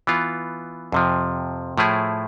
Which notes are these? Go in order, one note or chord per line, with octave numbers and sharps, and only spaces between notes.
E3 B3 F4
F2 C3 F3
A2 F3 A3 E4 G#4